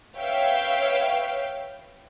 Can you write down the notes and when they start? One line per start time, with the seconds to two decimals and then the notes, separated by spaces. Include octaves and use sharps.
0.17 B4 C#5 E5 F5 G5